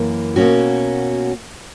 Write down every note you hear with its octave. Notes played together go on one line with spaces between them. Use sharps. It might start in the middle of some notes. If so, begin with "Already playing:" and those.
Already playing: F#2 E3 A#3
B2 A#3 C#4 F#4